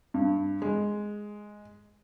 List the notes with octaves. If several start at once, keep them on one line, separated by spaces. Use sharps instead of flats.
G2
G#3